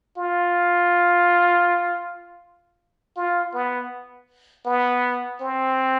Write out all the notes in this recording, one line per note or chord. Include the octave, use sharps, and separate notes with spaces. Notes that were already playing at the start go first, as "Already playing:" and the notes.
F4
F4
B3
B3
C4